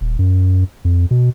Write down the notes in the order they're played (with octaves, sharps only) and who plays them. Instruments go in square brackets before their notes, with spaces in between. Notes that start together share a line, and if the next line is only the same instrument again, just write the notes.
[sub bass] D#1
F#2
F2
B2